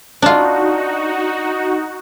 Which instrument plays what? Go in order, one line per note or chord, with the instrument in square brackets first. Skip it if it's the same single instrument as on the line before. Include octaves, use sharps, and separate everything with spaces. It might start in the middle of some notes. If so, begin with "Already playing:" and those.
[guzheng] D4 F4 [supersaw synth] D#4 F#4